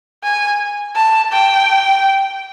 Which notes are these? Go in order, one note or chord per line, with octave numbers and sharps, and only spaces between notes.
G#5
A5
G5